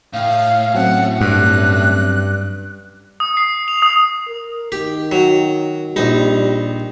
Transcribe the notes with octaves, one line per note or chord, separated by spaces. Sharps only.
A2 F5
F#3 C4 C#4 F#5
G2 F#6
D#6
C7
F7
D#6
A#4
D#3 G4
F#3
A#1 G3 D#4